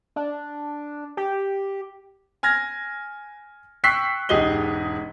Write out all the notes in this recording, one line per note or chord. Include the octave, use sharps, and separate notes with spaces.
D4
G4
G#5 F6 G#6 A#6
G5 C#6 E6 F#6 B6 C7
E1 G#2 G4 G#4 D#5 G7